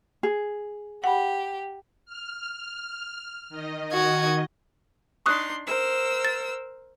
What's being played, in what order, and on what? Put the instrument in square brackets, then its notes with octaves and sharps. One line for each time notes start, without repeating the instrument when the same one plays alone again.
[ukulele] G#4
[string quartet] G4 [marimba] F#5 B5
[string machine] F6
D#3 D#5
[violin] F#4 G#6
[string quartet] D4 D#4 C6 [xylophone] C#6 D#6 F#6
[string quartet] A#4 C5 E6
[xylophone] A6